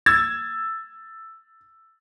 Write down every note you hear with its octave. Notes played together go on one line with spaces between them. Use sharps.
E6 G#6 A6